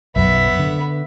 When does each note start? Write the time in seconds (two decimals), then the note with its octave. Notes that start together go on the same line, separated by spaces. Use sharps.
0.16 B1 F#2 F#3 B3 E5
0.59 D3